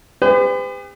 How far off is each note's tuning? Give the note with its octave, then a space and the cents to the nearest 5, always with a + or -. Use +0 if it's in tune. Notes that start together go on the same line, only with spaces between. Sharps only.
G4 +45 B4 +45